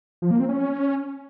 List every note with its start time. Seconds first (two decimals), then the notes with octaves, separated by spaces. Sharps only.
0.22 F3
0.31 A#3
0.40 C4
0.49 C#4